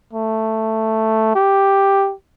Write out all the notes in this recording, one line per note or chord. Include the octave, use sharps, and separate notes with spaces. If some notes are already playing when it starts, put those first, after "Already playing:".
A3
G4